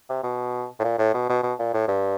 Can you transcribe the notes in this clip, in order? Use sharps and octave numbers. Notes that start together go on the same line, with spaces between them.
C3
B2
A2
A#2
A2
B2
B2
B2
A#2
A2
G2